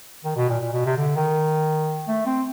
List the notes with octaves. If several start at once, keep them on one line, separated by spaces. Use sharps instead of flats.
D#3
B2
A#2
A#2
B2
C3
D3
D#3
A3
C4